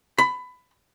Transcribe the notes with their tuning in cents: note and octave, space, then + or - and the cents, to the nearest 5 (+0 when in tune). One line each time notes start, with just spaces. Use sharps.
B5 +20